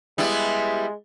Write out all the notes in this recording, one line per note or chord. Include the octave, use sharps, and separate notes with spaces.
G3 G#3 B3 E4